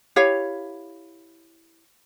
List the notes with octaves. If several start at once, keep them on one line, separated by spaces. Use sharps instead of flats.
E4 G4 C#5 F5